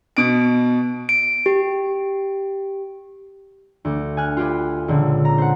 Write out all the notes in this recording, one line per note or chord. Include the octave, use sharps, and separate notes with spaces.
B2 D7
D7
G4
D2
G#5 F6 F#6
F4 G4 B4
C#2 A#2 D3
A#5
C5 F#5